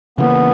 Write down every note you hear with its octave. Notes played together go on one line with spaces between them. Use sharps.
C#3 E3 G3 A#3 B3